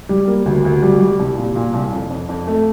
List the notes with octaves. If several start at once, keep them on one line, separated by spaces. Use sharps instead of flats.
G3
A#3
D2
D2
G3
G3
C2
A#2
A#2
C2
F2
F2
F2
A3